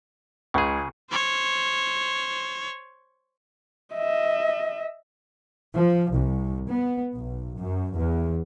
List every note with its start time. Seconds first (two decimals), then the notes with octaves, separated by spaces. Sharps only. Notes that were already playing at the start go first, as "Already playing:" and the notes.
0.54 C#2 C#3 G#4
1.12 C5 C#5
3.94 D#5 E5
5.75 F3
6.14 C2
6.70 B3
7.15 B1
7.59 F#2
7.93 E2